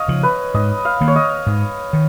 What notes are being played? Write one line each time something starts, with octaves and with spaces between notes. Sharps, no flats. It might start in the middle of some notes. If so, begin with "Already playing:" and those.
Already playing: C#5 D#5 F5
C#3 F3
B4
G#2 D#5
F5
D#3 A#3
C#5
D#5
G#2
D#3